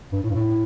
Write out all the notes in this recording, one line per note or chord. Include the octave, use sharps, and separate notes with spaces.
G2
A2
G2
A2